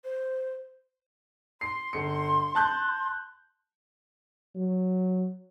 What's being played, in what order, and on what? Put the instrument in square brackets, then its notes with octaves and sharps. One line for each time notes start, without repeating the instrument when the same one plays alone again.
[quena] C5
[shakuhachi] C6 [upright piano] C7
[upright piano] G1 C#7
A5 F#6 G6
[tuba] F#3